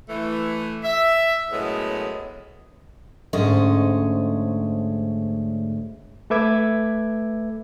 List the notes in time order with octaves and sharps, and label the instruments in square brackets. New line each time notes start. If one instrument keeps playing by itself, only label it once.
[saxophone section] E3 A3
E5
F#2 A2 G#3 B3
[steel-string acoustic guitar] D2 G#2 C#4 A4 D#5
[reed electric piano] A3 A4 B4 E5 D6 G#6